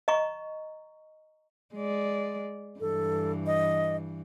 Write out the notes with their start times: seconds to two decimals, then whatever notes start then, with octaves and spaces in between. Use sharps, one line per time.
0.08 D#5 A#5 C#6
1.75 G#3 D5
2.80 G2 E3 A4
3.46 D#5